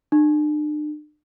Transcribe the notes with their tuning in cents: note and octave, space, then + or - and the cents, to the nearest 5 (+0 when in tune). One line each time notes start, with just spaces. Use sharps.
D4 +40